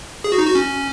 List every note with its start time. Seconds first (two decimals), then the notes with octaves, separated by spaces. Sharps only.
0.24 G#4
0.32 F#4
0.38 D#4
0.46 F#4
0.55 C#4